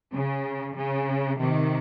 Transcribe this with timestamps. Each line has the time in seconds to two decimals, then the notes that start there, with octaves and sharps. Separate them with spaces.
0.12 C#3
0.76 C#3
1.39 C3 D#3